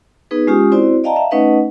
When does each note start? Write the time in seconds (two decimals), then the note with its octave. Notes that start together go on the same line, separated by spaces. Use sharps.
0.31 B3 D#4 G#4 B4
0.47 G#3 C#4 F4 G4 G#5 D#6
0.72 C4 E4 F#4 C5 D5
1.04 D5 D#5 F5 G5 A5 A#5
1.16 E5 F5
1.31 A3 C#4 D#4 B4 D#5 F#5